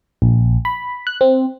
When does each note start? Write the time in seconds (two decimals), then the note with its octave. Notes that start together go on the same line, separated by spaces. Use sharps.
0.22 A#1
0.65 B5
1.07 F#6
1.21 C4